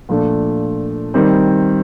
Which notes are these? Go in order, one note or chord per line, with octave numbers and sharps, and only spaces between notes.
A#2 F3 A3 D4
D#3 G3 C4